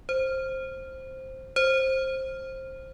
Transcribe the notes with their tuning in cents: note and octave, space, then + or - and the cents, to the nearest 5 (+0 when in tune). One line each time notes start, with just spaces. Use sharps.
C5 +10
C5 +15